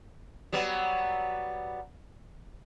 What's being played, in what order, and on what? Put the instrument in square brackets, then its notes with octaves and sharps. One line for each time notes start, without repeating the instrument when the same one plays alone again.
[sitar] F#3 G3 B3